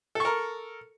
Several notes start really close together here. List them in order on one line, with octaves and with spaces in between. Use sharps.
A4 C#6 A#4